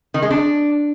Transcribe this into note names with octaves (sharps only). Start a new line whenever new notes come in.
D#3
G#3
D4